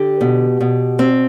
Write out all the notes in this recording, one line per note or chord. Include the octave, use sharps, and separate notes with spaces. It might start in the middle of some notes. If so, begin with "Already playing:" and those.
Already playing: D3 G4
B2
B2
C4